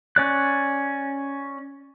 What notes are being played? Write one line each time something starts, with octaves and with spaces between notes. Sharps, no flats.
C#4 D5 F#6